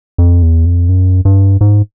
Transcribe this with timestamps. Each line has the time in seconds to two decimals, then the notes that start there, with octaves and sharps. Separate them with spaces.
0.18 F2
0.43 E2
0.66 F2
0.89 F#2
1.25 G2
1.61 G#2